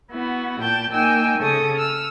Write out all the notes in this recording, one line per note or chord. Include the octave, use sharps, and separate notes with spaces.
B3 E4 F#4
A#2 G5 A5 G6
A#3 D#4 G5 G#5 E6
C#3 A4 C#6 D#6 G#6
E6 F6